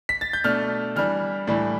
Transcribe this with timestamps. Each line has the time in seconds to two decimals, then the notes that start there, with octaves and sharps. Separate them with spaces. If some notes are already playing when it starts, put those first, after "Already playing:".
0.09 B6
0.21 A6
0.33 G6
0.44 B2 A3 D4 F6
0.96 E3 G3 D4 F6
1.47 A2 E3 G3 D4